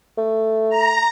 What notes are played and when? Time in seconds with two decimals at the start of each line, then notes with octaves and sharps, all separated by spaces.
0.18 A3
0.70 A#5